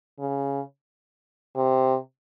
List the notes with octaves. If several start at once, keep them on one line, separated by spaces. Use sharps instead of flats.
C#3
C3